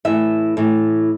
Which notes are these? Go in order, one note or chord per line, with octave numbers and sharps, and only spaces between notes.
A2 E3 E5
A2 E3